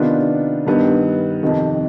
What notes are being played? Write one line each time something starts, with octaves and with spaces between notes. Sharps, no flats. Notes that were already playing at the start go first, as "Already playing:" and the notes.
Already playing: C3 D#3 B3 D4 F4
G2 D#3 G3 B3
F2 C3 D#3